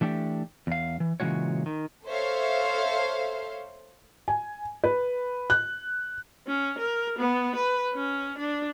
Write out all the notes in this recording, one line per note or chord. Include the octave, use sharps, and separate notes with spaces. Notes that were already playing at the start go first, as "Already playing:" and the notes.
E3 A3 D4 G4
E2 F5
E3
A#2 C#3 E3 G#3 F#4 C#5
D#3
A4 C5 C#5 E5 F5
G#5
B4
F#6
C#4
A#4
B3
B4
C#4
D4